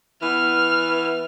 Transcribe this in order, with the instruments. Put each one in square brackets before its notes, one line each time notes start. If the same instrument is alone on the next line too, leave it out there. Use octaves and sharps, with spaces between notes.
[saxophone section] E3 B3 [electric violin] F6